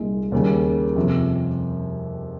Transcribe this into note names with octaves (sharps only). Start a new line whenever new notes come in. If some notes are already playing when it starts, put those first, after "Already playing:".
Already playing: C2 A#2 G#3 D#4
D#2 C#3 G3
F2 C3 F3